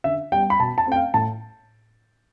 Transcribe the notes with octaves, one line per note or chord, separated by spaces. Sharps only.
D3 E5
G3 B3 G5
B5
B2 A5
A5
A3 C4 G5
F5
A2 A5